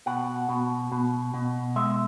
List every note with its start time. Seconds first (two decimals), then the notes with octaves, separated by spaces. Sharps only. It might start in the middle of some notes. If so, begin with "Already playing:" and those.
0.06 B2 F#5
0.49 B2
0.92 B2
1.34 B2
1.76 G#3 E5